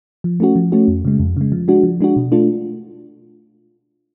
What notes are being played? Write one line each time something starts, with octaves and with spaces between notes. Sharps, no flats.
F3
A3 C#4 F#4
F3
A3 C#4 F#4
F2
C#3 G#3
F2
C#3 G#3
F3
G#3 D4 F#4
F3
G#3 D4 F#4
B2
A3 D4 F4